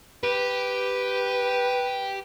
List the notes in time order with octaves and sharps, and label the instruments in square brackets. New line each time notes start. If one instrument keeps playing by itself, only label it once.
[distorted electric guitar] G4 [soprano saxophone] B4